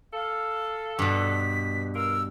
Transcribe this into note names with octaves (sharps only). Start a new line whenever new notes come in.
A4 F5
G2 B2 B6
F4 A#4 E6